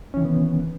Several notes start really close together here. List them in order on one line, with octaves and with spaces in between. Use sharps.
C#4 E3 D#3 C3 B3